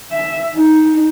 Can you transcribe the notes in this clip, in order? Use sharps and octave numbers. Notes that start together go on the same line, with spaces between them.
E5
D#4